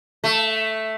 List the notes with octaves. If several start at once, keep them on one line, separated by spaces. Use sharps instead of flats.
A3